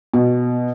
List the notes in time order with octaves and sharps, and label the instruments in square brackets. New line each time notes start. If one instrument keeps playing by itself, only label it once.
[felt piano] B2